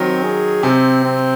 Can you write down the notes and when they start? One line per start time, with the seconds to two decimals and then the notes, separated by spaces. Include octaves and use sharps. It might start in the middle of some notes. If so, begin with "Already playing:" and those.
Already playing: D#3 F#3 C4
0.23 G#4
0.63 C3 C4
1.04 C4